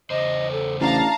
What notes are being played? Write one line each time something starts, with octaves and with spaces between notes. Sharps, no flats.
E2 C#3 C5 D#5
A4
A1 D4 F5 A5 A#5